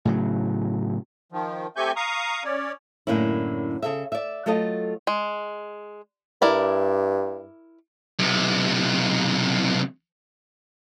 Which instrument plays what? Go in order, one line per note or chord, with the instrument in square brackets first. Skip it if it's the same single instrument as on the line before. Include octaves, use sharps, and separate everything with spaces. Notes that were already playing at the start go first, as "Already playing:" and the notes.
[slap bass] A2 C#3 F#3
[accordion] D#3 F3
A3 C4 G4 G#5 C#6 G6
F5 A#5 C#6 D#6
C#4 C#5 D5
[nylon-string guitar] F#2 A2 D3 A#3 C#4 E4
C#3 A4 E5
D5 E5
F#3 A3 F4 A4 D#5
[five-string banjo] G#3
[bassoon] G2 [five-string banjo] E4 A#4 D5
[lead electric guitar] B1 C3